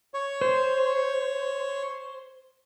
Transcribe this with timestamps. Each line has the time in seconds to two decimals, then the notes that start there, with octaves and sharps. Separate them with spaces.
0.14 C#5
0.41 C5